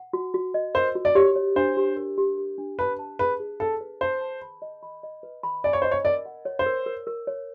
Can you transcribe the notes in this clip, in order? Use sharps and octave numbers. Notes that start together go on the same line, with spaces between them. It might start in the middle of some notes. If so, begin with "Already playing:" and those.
Already playing: F#5
F#4
F#4
D#5
A#4 C5
F#4
D5
G4 C#5
C#5
D4 C5
G4
A#4
G4
G4
D4
B4 A5
A5
G#4 B4
G#4
A4 A5
B4
C5 A5
A5
B5
D#5
B5
D#5
B4
B5
D5 G#5
C#5
C5 D#5
C#5
A#4 D5
F#5
C#5
C5
A#4
A#4
A#4
C#5